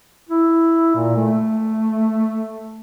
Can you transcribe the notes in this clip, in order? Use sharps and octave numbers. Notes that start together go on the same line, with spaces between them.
E4
A#2
A3